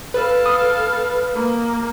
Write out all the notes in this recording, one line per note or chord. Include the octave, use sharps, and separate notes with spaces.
A4 B4 F5
D#6
A#3